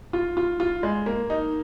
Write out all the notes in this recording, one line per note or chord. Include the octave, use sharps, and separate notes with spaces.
F4
F4
F4
G#3
A#3
D#4